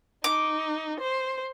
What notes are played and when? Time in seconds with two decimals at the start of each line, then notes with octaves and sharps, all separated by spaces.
0.24 D#4 D6
1.00 C5